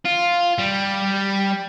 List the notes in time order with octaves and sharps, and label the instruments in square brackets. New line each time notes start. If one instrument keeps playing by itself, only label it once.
[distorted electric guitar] F4
G3